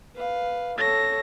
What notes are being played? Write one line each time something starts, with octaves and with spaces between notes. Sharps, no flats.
B4 F5
A4 C#5 A#6